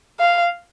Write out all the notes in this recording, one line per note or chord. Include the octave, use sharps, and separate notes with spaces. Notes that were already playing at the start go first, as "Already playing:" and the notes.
F5